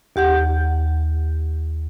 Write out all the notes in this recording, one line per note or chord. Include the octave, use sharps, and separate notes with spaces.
D#2 G4 F#5 G6